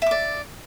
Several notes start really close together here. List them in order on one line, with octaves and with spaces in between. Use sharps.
E5 D6 D5